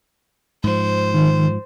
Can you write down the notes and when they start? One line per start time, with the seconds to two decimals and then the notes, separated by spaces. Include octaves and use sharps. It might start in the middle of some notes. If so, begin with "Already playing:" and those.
0.64 G#2 F3 C5
1.14 D#3